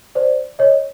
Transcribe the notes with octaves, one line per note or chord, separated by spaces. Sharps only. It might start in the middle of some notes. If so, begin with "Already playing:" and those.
C5 D5
C#5 D#5